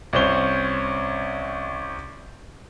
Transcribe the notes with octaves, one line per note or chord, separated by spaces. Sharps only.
C2 C4 C#4 C5 C#5 G7